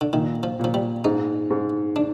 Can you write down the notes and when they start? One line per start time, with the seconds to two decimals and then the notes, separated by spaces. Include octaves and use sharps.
0.01 D3
0.13 A#2 D#3
0.43 F3
0.59 A#2 F3
0.74 G3
1.04 G#2 D#4
1.50 G#2
1.96 D4